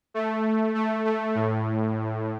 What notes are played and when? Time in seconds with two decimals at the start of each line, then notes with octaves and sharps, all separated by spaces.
0.14 A3
0.75 A3
1.05 A3
1.35 A2